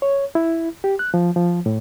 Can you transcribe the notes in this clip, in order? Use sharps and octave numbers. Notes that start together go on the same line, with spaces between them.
C#5
E4
G4
F#6
F3
F3
A2